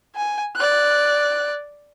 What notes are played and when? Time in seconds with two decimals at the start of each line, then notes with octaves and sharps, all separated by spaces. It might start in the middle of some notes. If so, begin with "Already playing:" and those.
0.15 G#5
0.56 D5 F#6